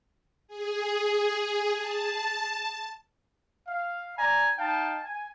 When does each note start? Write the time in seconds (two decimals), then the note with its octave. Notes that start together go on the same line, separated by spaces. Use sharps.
0.48 G#4
1.76 A5
3.67 F5
4.17 D5 G#5 A#5
4.58 D#4 F5 G5 A5
5.03 G#5